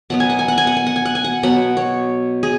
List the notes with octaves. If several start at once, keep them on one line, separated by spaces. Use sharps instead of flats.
B2 F#3 B3 F#5
G#5
F#5
G#5
F#5
G#5
F#5
G#5
F#5
G#5
F#5
G#5
F#5
B2 F#3 B3 F#5
C#5
G#4